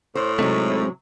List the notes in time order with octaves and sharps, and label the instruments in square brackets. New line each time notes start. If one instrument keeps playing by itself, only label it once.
[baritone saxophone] A2 [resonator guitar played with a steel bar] C5
[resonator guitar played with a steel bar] C3 F#3 [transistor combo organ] G#3 C4 [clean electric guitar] A3 D#4